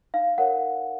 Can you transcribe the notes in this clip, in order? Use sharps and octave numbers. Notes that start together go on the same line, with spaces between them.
D#4 F5
A#4 C#5 F#5